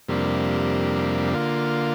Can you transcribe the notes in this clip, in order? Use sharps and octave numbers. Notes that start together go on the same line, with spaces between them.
F2 C3 G3 A#3 D4
D3 A#3 F4